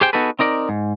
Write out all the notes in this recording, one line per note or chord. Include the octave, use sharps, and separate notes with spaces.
G4 G#4 C5 G5
B3 D#4 F#4 G#4 A4 B4
C4 D#4 A#4 D5
G#2